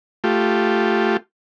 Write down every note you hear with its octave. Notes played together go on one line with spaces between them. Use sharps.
A3 F4 G4